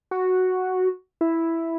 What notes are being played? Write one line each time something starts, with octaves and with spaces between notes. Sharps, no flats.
F#4
E4